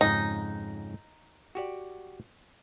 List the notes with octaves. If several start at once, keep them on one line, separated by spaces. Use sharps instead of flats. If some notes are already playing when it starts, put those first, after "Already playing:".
F2 G#2 C#3 D#4
F#4 G4 D5